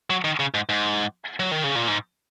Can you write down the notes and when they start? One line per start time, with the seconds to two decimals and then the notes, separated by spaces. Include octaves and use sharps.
0.10 F#3
0.24 D#3
0.40 C#3
0.54 G#2
0.69 G#2
1.40 F#3
1.52 D#3
1.64 C#3
1.75 A#2
1.88 G#2